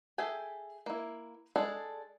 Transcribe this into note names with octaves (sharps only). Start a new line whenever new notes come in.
G#4 A4 E5 G5 G#5
A#3 E4
G#3 D4 G#4 A4